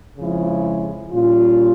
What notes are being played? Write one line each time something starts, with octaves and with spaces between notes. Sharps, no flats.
F2 C#3 F3 G#3 E4
A#2 G3 C#4 F4